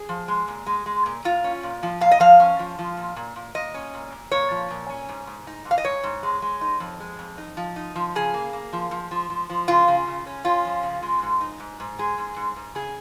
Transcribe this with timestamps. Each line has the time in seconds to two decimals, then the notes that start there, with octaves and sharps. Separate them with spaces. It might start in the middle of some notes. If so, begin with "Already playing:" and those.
Already playing: G#4
0.09 F3
0.28 G#3
0.48 A#2
0.66 G#3
0.86 G#3
1.06 A#2
1.24 A#2 F4
1.44 C#4
1.63 A#2
1.83 F3
2.01 A#2 F5
2.11 D#5
2.20 F3 F5
2.40 C#4
2.59 F3
2.79 F3
2.97 A#2
3.16 A#2
3.36 A#2
3.55 A#2 D#5
3.74 C#4
3.94 A#2
4.12 A#2
4.31 A#2 C#5
4.51 F3
4.70 A#2
4.89 C#4
5.09 G#2
5.27 G#2
5.47 D#4
5.65 G#2
5.71 F5
5.78 D#5
5.84 G#2 C#5
6.03 G#2
6.23 G#3
6.42 G#3
6.61 D#4
6.80 F2
7.00 G#3
7.19 F2
7.38 D#4
7.57 F3
7.76 D#4
7.95 F3
8.15 C#3 G#4
8.34 A#3
8.53 A#3
8.73 F3
8.91 F3
9.11 F3
9.30 F3
9.50 F3
9.68 C#3 F4
9.88 C#3
10.07 C#3
10.26 C#4
10.45 C#4 F4
10.65 F3
10.83 C#3
11.03 G#3
11.22 G#2
11.41 D#4
11.60 G#2
11.80 G#2
11.99 G#3 G#4
12.18 G#2
12.36 G#2
12.56 G#2
12.75 C#3 G#4